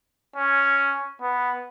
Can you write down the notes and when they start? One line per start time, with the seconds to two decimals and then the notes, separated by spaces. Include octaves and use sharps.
0.36 C#4
1.22 B3